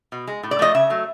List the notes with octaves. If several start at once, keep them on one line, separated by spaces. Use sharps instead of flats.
B2
G#3
A2
D5
F3 A3 D#5
C#3 E5
F#3 A3